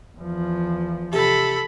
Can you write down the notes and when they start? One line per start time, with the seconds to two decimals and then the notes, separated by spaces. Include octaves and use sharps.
0.18 E2 F3
1.13 C3 A4 B5